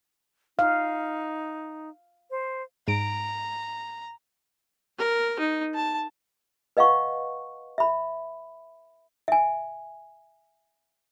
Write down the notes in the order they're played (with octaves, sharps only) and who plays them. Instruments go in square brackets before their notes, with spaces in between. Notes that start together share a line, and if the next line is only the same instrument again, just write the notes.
[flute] D#4 [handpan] F5
[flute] C5
[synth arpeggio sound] G#2 D7 [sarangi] A#5
[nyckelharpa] A#4
D#4
A5
[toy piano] B4 D#5 F5 F#5 C#6
E5 B5
E5 G#5